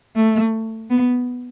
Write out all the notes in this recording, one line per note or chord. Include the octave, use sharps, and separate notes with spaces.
A3
B3